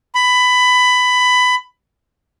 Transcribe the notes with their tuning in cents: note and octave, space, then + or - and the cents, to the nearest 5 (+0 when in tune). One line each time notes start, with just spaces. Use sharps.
B5 +15